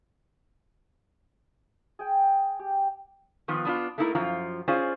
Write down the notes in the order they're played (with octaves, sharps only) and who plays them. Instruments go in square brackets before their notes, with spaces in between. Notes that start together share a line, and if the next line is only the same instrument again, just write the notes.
[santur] G#4 G5
G4
[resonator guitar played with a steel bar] D#3 F3 B3 F4
B3 D4 F4
A3 A#3 D#4 E4 G4 A#4
F#2 F3 F4 A#5
C#4 F4 G#4 C5 D5